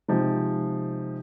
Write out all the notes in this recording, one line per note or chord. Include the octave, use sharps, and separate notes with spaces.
C3 F3 G#3 D#4